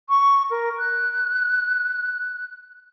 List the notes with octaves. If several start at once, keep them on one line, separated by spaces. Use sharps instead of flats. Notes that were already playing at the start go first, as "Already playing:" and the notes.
C#6
A#4
F#6